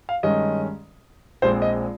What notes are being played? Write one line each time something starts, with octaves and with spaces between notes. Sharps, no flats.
F5
G2 D#3 G#3 C#4 D#5
A#1 A#2 G#3 C4 C5
D#5